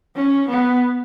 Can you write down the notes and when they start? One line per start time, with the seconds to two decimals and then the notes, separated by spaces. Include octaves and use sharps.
0.16 C#4
0.49 B3